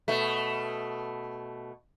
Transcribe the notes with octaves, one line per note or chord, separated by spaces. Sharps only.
B2 A3